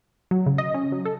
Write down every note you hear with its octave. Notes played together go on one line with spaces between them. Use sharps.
F#3
C#3
D#5
C#4
F#3
A4